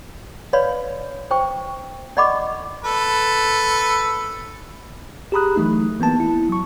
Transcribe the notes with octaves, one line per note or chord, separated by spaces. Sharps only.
B4 C#5 D5 F5 B5 C6
C5 G5 C#6
D5 D#5 F#5 B5 C#6 D6
A4 B4
G4 G#4 A#5 B5 D#6 F#6
E3 F#3 A3 D#4
E3 A#3 B3 A5
E4
F#3 C#6